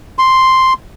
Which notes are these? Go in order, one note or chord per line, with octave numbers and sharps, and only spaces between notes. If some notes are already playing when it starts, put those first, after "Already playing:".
C6